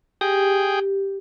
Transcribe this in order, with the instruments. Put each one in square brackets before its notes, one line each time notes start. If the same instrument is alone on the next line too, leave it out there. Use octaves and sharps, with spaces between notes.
[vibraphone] G4 [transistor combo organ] G#4 G5